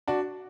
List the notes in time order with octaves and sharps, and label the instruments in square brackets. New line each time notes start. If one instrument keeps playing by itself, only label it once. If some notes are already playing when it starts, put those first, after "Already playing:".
[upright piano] D4 F#4